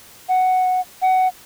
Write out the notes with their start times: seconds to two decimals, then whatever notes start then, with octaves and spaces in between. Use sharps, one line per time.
0.29 F#5
1.02 F#5